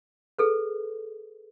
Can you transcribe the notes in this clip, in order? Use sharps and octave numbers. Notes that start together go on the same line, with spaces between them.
G#4 A4 B4